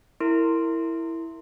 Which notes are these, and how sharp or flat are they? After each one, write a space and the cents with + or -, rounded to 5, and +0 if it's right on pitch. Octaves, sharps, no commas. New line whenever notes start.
E4 +0 A#4 -20 C6 +0